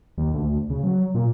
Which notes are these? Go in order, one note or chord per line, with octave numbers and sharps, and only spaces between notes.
D#2
D2
C#3
F#3
A#2